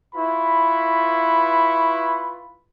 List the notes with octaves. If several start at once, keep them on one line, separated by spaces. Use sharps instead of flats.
E4 F4 B4 B5 C#6